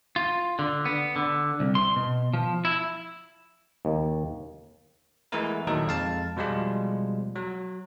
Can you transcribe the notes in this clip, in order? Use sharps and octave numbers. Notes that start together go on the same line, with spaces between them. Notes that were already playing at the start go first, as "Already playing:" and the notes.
F4
D3
B3
D3
C2
C6
B2
F3
E4
D#2
E3 G#3 A3 B3 E4 A#4
A#2 D#3 F#3 D#4 A4
F2 G#3 F5 A5
B2 F3 G3 G#3 F4
F#3